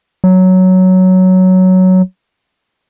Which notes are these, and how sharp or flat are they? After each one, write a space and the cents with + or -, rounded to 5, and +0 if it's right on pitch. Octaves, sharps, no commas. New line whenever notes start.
F#3 +5